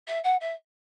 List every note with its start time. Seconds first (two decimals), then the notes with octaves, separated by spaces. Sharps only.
0.07 E5
0.24 F#5
0.40 E5